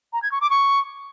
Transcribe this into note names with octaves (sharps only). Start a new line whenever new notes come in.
A#5
G#6
C#6
D6
C#6